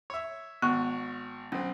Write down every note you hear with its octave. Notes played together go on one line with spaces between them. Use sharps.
C#5 E5
G#1 B3 C#6
B1 C4 C#4